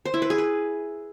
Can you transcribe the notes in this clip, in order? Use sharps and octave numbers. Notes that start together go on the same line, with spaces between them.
C5
E4
B4
G#4
B4